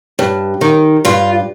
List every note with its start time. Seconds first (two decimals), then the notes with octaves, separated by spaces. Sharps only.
0.19 G2
0.61 D#3
1.05 G2 F4